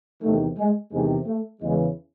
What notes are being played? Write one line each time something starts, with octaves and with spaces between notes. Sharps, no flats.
E2 C3 D#3 A3
G#3
E2 C3 D#3 G#3
A3
E2 C#3 E3 G#3